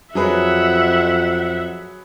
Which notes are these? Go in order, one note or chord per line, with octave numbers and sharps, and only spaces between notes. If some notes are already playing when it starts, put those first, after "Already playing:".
F2 F#3 G#4 B4 E5 F#5